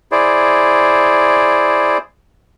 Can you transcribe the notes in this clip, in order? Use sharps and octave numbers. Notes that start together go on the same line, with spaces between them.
E4 G#4 C5 D5